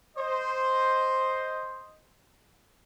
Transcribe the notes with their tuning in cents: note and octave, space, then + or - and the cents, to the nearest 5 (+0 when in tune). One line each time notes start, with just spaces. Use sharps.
C5 +0 D#5 +0